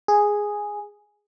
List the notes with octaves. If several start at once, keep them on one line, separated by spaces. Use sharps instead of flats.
G#4